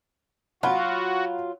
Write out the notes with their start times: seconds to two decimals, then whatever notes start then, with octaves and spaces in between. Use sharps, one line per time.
0.63 F#3 F4 F#4 F#5 B5